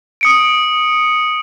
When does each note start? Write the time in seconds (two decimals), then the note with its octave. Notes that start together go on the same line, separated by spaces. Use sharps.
0.21 D#6 C#7 D7